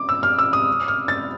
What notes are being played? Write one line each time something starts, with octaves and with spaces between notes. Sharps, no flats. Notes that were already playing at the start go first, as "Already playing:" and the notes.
Already playing: D6
E6
F6
E6
D#6
F6
A6